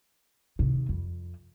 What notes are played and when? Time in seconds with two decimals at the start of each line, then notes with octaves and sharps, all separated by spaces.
0.59 C3 D#3
0.89 F2